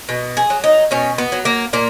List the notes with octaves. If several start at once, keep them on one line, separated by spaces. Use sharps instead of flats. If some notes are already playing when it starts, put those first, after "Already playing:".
B2
G#4
F#3
D#4
B2 C#4
B3
F#3
A#3
A#2 A#3